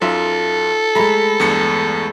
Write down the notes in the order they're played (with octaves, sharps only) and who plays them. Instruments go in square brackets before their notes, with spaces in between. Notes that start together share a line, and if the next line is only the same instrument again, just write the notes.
[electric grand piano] F#2 [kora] D#4 F4 E5 [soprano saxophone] A4
[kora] G#3 A3 [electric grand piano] A#5 B5
[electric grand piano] E2 G2 C#7